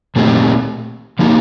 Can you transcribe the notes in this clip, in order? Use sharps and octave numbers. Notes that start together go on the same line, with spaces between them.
A#2 A3 C4 D#4 G4
F3 A#3 D#4 G4